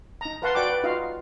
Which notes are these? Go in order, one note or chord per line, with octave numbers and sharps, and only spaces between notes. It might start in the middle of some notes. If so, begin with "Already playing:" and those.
D#4 A#5
A#4 B4 F5 F#5 A5 C6
F#4 D5 F#5 G5 D6
B4
D#4 F4 F#4 D#5 F5